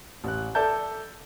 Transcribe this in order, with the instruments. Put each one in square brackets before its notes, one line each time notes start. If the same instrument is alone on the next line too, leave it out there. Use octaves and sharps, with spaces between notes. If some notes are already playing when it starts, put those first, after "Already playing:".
[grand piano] A1 F#6
A4 D5 E5 A5 G6